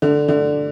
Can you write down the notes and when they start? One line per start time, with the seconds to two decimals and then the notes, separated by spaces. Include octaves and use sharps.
0.02 D3
0.28 D3